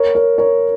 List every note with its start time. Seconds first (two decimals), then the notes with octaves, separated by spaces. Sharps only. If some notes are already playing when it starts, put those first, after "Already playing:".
Already playing: A#4 C#5
0.15 A#4 C#5
0.38 A#4 C#5